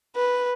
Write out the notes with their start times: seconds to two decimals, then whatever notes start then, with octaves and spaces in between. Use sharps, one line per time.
0.16 B4